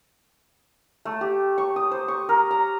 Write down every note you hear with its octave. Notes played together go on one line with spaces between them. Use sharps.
A3
G4
C#6
D#6
C5
C#6
A#4
A#5